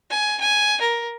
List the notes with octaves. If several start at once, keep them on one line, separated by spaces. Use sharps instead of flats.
G#5
G#5
A#4